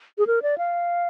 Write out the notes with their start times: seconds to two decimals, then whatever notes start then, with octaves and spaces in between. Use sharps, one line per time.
0.18 G#4
0.27 A#4
0.42 D5
0.58 F5